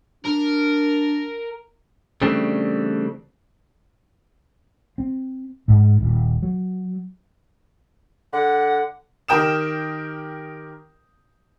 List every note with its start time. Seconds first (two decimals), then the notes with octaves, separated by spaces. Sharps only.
0.25 D4 A#4
2.22 C#3 E3 G3 A3 C4 D4
4.98 C4
5.68 G#2
6.01 D#1
6.42 F#3
8.33 D3 F#5
9.28 D#3 G4 A#4 G5 D#6 E7